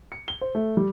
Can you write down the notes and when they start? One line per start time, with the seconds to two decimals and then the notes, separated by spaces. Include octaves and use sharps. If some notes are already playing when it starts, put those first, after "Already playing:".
0.12 C#7
0.28 G7
0.41 C5
0.55 A3
0.77 G3